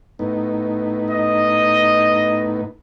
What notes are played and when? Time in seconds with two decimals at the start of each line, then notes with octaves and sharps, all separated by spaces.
0.19 A2 B3 D#4
1.10 D#5